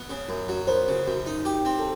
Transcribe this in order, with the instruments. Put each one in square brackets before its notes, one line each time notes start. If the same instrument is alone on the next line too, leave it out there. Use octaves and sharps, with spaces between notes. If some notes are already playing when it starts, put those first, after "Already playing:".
Already playing: [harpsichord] B3
C#3
F#2
F#3
[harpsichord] B3 [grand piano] A#4 C5
[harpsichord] C#3
F#2
D#4
G4
C4
[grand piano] A4